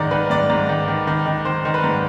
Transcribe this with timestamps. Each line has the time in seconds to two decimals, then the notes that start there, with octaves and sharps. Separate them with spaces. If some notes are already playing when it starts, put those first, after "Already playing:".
Already playing: G#2 D#3 D5
0.11 D#3 B4
0.30 G#2 D5
0.50 G#2
0.69 D#3
0.88 D#3
1.07 D#3
1.26 D#3
1.45 D#3 C5
1.65 D#3
1.74 B4
1.84 G#2